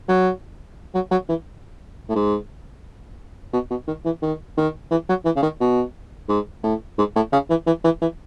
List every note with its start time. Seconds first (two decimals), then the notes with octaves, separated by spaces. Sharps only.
0.08 F#3
0.94 F#3
1.11 F#3
1.29 E3
2.09 A2
2.15 G#2
3.53 B2
3.70 B2
3.87 D#3
4.05 E3
4.22 D#3
4.57 D#3
4.91 E3
5.09 F#3
5.25 E3
5.36 C#3
5.42 D#3
5.60 B2
6.28 G#2
6.63 A2
6.98 G#2
7.15 A2
7.32 C#3
7.50 E3
7.67 E3
7.84 E3
8.01 E3